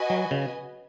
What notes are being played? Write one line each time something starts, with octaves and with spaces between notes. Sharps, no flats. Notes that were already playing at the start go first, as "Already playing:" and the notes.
Already playing: F#4 B4 D#5 G#5
F#3
C#3